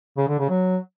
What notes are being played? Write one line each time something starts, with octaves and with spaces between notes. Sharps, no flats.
C#3
D3
C#3
F#3